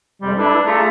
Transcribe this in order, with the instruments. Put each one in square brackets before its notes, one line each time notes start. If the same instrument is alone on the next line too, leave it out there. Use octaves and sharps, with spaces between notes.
[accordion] F2 C3 G#3 [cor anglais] G3
[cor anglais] D4 [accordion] E4 A4 B4
[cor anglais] A3 [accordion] F4 G#4 A#5